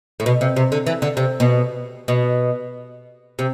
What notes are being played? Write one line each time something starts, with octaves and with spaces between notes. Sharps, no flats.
A2
B2
C3
C3
D3
E3
D3
C3
B2
B2
C3